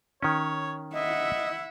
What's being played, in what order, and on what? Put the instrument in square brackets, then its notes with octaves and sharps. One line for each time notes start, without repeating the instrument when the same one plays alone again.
[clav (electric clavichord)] D#3 C#4 [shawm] C#5
[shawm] E4 [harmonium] D#5 [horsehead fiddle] E5 F#5